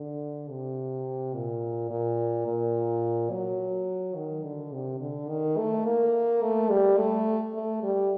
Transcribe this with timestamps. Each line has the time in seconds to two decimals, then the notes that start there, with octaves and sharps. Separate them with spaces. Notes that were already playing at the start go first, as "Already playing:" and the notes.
Already playing: D3
0.50 C3
1.34 A#2
1.90 A#2
2.47 A#2
3.31 F#3
4.16 D#3
4.44 D3
4.73 C3
5.00 D3
5.29 D#3
5.58 A3
5.85 A#3
6.42 A3
6.70 G3
6.98 A3
7.55 A3
7.83 G3